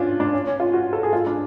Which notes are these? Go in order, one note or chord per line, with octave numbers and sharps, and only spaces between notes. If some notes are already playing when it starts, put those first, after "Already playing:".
Already playing: C#4 D4 F4
D4
C#4
C#4
F4
F#4
A4
G#4
F4
D4